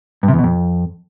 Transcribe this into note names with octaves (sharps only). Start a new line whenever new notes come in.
G2
C3
E2
B2
F2